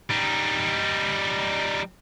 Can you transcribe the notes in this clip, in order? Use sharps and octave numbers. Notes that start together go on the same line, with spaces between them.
G3 D#4